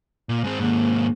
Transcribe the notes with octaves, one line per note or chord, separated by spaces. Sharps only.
A#2
G#2 C4
D#2 G#2 A#3